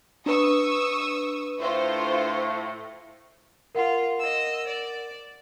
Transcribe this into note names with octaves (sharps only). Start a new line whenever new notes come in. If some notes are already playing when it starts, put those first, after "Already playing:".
D4 B4 C#6 D#6 E6
A2 A3 F4 C5
F4 A#4 F#5
D#5 E6
D5